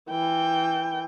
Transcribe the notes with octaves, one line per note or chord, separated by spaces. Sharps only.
E3 G5